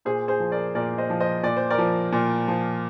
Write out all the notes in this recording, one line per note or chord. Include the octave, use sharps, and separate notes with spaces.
A#2 G#4 C5
G#4 C5
F3
A#4 D5
A#2 A#4 D5
C5 D#5
F3
C5 D#5
A#2 D5
C5
A#4 D5
F3
A#2
F3